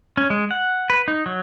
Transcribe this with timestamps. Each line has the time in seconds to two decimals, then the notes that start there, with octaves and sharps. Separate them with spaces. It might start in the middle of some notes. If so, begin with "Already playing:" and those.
0.17 C#4
0.30 G#3
0.51 F#5
0.90 B4
1.08 D#4
1.26 F#3